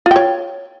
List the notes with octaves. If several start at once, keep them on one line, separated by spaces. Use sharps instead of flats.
F4 C#5 G5